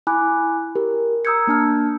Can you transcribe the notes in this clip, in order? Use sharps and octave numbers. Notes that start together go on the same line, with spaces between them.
E4 G#5 B5 D6 F#6
G4 A#4
A#5 D#6 E6 G6 G#6 C#7
A#3 D4 A5 F6